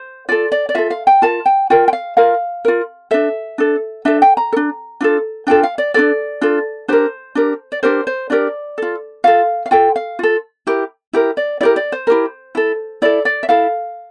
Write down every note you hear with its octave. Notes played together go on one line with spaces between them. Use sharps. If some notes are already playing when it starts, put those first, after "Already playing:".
Already playing: C5
F4 A4 D5
D5
D5
F4 A4 E5
F5
G5
F4 A#4 A5
G5
F4 A#4 G5
G5
F5
F4 A#4 F5
F4 A#4
D4 A4 E5
D4 A4
D4 A4 E5
G5
A#5
A4
D4
D4 F4 A4
D4 F4 A4 G5
F5
D5
D4 F4 A4 D5
D4 F4 A4
D4 G4 A#4 C5
D4 G4 A#4
D5
D4 G4 A#4 C5
C5
D4 G4 A#4 D5
F4 A4
F4 A4 F5
F5
F4 A4 G5
F5
F4 A4
E4 G4 A#4
E4 G4 A#4
D5
E4 G4 A#4 D5
D5
C5
E4 G4 A#4
E4 A4
E4 A4 D5
D5
E5
E4 A4 F5